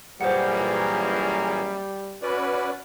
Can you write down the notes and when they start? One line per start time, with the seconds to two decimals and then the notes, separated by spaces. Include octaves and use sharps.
0.21 F#2 A#2 E3 G3 A#3 G#4 C5 F#5
2.22 C#4 F#4 B4 D5